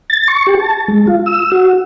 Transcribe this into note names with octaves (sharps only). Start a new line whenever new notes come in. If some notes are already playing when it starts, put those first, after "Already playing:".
A6
C#6
G4
A5
G#3
F4
E6
F#4